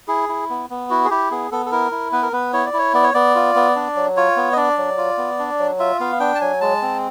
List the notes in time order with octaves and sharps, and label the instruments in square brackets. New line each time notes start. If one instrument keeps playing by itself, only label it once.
[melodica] E4 G#4
E4
B3
B3
E4 F#4
G#4
E4 G4
B3 G#4
B3 A4
A4
E4 A#4
E4
B3 B4
A#4
B3 B4
E4 C#5
D5
E4 C#5
B3 D5
C#5
B3 D5
F4
B3
D4
F#3
F4 C#5
B3
D#5
D4 D5
F#3
F4
B3
D4
F#3
F4 E5
B3 F5
D4 G5
A5
F#3 G#5
G#3 A5
C4